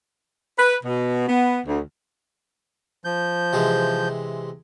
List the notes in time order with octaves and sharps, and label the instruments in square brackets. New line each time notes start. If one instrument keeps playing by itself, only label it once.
[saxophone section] B4
B2
B3
D2
[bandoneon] F3 G6
[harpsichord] C3 E3 G#3